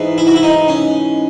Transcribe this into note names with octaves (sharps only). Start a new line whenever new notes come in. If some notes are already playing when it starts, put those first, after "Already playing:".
Already playing: G#2 E3 B3
E4
F#4
E4
D#4
C#4